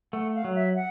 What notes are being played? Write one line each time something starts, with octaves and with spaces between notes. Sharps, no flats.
A3 F#5
F5
F#3
E5
F#5